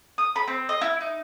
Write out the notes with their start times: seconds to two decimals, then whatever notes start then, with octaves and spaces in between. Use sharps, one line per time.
0.18 D#6
0.36 B5
0.48 C4
0.69 D#5
0.81 E4
1.01 D#4